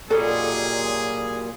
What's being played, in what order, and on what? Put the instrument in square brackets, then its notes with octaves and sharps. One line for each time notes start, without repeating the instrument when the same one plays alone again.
[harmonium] A#2 [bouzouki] F#3 G3 D#4 [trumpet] G#4 [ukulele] A4